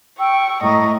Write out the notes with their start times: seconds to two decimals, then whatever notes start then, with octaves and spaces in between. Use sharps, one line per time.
0.19 G5 C#6 E6
0.63 A2 D#5 A#5 C#6